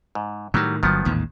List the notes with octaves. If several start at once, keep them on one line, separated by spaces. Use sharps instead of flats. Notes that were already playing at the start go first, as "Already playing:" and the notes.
G#2
A2 D#3 F#3 G3
G1 D#3 F3 F#3 B3
A1 D#2 G#2